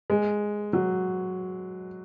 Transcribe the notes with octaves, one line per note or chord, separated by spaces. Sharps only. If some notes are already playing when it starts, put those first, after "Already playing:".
G#3
F#3